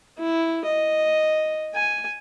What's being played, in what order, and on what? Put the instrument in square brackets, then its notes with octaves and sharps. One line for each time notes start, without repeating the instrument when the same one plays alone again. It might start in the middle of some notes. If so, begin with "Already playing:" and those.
[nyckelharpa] E4
D#5
G#5